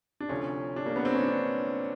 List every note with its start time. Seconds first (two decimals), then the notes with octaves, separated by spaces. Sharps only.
0.20 D4
0.29 D2 C3 F3 C#4
0.76 D4
0.86 A#3
0.96 B3
1.05 C4
1.14 C#4
1.23 D4